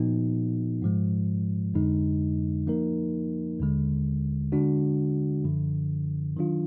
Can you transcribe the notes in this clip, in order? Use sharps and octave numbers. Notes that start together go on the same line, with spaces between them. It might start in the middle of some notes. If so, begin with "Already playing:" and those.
Already playing: A#2 F3 B3 D#4 F#4
G#2 F3 G#3
F2 D3 G#3 D#4
F3 A#3 D#4 A#4
D#2 D3 G#3
D3 G#3 D4 F#4
F#2 D3 F3
D#3 F#3 D4 F4